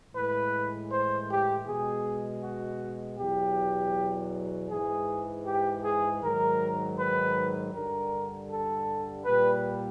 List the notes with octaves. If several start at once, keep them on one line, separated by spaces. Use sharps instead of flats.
A2 E3 G#3 B4
C5
G4
B2 G#3 G#4
F#4
E2 B2 F#3 G4
G#2 E3 G#3 G#4
G4
G#4
G#2 D#3 F#3 A#4
B4
G2 D3 G3 A#4
A4
A#2 G3 B4